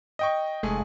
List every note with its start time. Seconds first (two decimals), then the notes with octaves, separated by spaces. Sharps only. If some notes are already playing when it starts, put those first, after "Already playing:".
0.19 D#5 G5 C#6
0.63 F1 G#3 A3 G#4